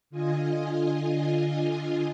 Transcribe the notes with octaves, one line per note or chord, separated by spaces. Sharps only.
D3 F4 D#5 G#5